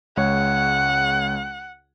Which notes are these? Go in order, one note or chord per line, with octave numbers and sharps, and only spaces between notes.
C#2 G#3 C#5 F#5